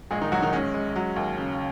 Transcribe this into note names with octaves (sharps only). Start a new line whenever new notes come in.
A#1 G#3 G#4
D#3 D#4
A#1 F#3 F#4
D#3 D#4
G#3 C#4
G#3
F#3
D#2
C#3